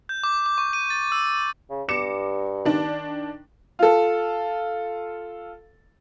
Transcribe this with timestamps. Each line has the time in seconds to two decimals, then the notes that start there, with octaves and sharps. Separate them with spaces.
0.09 G6
0.24 D6
0.46 D6
0.58 C#6
0.73 D#7
0.90 A6
1.12 E6
1.70 C#3
1.89 G2 D6 C#7 E7
2.65 D#3 D4
3.79 F4 A4